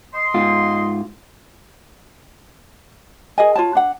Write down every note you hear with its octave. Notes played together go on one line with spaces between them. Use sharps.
D#5 C6
G#2 F4
G#4 A#4 D#5 G#5
F4 C#5 A5
D4 F#5